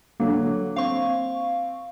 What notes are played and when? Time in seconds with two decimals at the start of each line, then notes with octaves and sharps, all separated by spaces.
0.20 D3 F#3 A#3
0.76 C4 F5 C#6